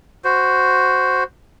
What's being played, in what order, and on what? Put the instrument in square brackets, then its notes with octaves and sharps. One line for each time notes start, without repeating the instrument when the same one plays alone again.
[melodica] F#4 C5